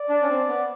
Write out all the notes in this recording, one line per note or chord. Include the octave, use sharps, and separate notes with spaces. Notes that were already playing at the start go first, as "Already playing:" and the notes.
Already playing: D5
D4
C#4
C4
B3